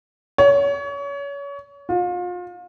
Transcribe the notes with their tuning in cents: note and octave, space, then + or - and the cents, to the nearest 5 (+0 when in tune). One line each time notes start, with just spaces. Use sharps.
C#5 +30
F4 +35